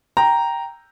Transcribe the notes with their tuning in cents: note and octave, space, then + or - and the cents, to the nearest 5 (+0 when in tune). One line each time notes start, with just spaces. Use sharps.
G5 +0 A#5 +0